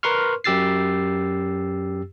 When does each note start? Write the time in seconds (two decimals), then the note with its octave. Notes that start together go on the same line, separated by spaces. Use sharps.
0.03 A#4 B4 C6 C#6 F6
0.44 F#2 G4 E6 A6 C7